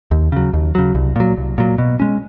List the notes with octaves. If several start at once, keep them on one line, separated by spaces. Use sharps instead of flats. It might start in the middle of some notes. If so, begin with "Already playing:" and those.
D#2
C#3 F#3
D#2
C#3 F#3
C2
A#2 F#3
C2
A#2 F#3
B2
G#3 C#4